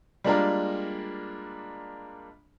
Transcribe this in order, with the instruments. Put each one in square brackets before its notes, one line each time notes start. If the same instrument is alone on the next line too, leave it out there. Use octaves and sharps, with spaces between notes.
[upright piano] G3 G#3 A#3 D4 F4 A#4